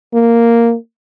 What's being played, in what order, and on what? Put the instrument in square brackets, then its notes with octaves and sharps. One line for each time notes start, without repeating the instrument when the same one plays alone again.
[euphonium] A#3